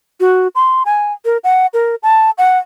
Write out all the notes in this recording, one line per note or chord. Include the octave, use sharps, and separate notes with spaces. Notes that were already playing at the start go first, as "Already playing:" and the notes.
F#4
C6
G#5
A#4
F#5
A#4
A5
F#5